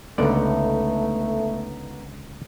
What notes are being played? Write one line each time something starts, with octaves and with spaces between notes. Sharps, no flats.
C#2 D3 A3 B3 D#4 D5